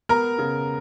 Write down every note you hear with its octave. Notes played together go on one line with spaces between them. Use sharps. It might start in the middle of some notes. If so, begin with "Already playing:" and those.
B3 A#4 A#5
C#3